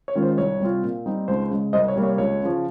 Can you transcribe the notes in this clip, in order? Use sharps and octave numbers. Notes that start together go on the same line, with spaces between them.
C#5
D#3 G#3 C#4 F4
C5
C2 C#5
C3 G3 C4 F4
A#2
G3 C4 D#4
C#2 C5
C#3 G#3
C2 C5 D#5
C#5
C3 G3 A#3
C#5
C#2 C#5
C#3 F3